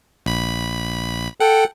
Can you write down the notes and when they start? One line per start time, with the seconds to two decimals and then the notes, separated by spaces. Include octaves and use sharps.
0.26 A#1 B5
1.40 A4 F#5 G5